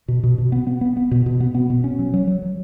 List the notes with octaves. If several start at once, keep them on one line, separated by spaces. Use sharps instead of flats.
B2
B2
B2
B3
B3
B3
B3
B2
B2
B3
B3
B2
C#4
F#3
F#3
F#3
F#3